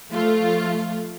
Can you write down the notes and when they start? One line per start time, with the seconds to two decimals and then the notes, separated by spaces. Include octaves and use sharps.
0.11 F3 A3 F4